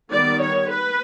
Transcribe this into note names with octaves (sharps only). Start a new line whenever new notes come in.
D#3 G3 B3 D5
C#5
B4